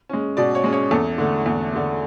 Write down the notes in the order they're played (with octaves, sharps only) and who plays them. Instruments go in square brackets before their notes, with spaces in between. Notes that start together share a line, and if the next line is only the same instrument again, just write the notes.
[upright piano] G#3 C#4
B2 D5
C#5
G#3 C#4
C#5
E2 A4
D3 A3
E2
D3 A3